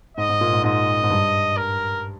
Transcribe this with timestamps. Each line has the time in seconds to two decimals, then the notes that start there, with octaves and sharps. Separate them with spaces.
0.17 G#2 D#5
0.29 G#2
0.41 A#2
0.52 G#2
0.64 G#2 D#5
1.03 G#2
1.10 G2
1.57 A#4